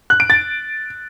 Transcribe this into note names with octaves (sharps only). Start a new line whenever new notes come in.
F#6
D7
A6